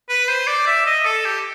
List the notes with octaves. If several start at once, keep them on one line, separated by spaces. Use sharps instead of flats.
B4
C5
D5
E5
D#5
A4
G4